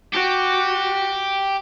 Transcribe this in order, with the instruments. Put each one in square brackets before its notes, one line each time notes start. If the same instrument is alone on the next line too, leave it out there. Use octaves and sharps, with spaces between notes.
[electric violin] F#4 [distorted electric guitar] G4